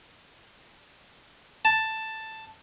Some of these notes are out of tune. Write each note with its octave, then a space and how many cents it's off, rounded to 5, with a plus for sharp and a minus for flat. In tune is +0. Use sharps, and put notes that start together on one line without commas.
A5 +5